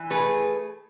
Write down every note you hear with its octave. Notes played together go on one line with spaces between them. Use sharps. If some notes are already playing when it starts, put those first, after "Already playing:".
Already playing: E3
A3 G#4 B4